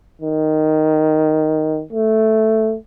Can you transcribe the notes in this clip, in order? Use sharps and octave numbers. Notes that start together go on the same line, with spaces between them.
D#3
A3